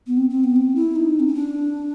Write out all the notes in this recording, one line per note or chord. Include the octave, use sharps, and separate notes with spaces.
B3
C4
C4
B3
C4
E4
D#4
C4
C#4
D4